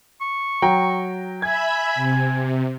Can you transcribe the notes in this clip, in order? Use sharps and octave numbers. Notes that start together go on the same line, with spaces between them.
C#6
F#3 G5 A#5
E5 G#5 B5 G#6
C3